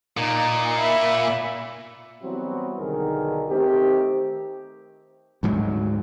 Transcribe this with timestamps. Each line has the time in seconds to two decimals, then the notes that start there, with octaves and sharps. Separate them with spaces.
0.17 A#2 D#4
0.79 E5 B5
2.23 E3 F#3 G3 B3 C4 F#4
2.80 B1 D3 D#3 G#4 A#4
3.50 D#3 A3 C4 G4
5.43 D2 G#2 F#3